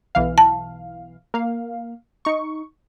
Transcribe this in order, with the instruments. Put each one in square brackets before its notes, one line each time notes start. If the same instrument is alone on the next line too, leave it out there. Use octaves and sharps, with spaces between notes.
[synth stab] B1 E3 F5
[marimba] A5
[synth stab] A#3 F5
D#4 C#6